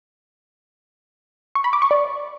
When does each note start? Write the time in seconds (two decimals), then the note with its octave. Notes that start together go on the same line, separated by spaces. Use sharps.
1.55 C#6
1.64 B5
1.73 D6
1.82 C#6
1.91 D5